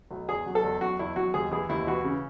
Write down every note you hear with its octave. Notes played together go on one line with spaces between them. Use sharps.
B1
E2 G#4
F#3
A4
E2
F#3 F#4
E2 E4
F#3 F#4
D#2 G#4
E3 G#4
D#2 E4
E3 F#4
C#3